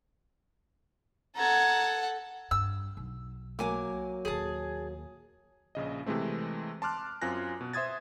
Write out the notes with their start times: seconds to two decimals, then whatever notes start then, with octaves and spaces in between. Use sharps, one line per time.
1.36 A4 F#5 A#5 G#6
2.51 G2 E6
2.97 B1
3.59 F#3 A#3 G#5 D6
4.25 D#2 A#2 G#4 A5
5.75 A#1 C#3 D#5
6.06 C3 E3 G#3 A3 C4
6.82 A5 C6 D6 F6 F#6
7.22 F#2 C4 F4 G#5 F#6 A#6
7.61 B2
7.73 C5 E5 C6 D#6 G#6 A6